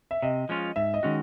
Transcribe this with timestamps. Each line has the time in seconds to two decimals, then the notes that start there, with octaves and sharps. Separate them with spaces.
0.11 E5
0.22 C3 D#5
0.49 F3 G#3 C#4 F4
0.76 G#2 E5
0.94 D#5
1.03 D#3 G#3 C#4 F#4